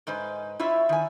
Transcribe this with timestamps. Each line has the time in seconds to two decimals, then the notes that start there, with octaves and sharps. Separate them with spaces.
0.07 G#2 G#3 B4 C5
0.60 E4 F4 C#5 E5
0.89 D#3 G#5